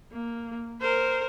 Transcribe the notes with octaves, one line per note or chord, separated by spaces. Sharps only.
A#3
A#4 C5